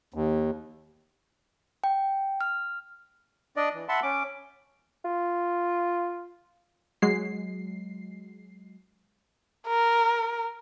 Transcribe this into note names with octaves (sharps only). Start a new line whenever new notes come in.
D#2
G5
F6
D4 D5 D#5
E3
E5 F#5 A5 B5 C6
C#4 D6
F4
F#3 G#3 C7
A#4